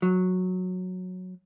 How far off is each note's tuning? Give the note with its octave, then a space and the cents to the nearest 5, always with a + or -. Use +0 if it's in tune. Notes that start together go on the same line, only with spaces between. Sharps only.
F#3 -10